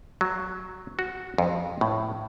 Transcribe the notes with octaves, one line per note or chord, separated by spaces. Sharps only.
F#3
F#4
F2
A2